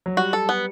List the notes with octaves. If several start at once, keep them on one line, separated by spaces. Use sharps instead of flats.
F#3
G3 F#4
A4
B3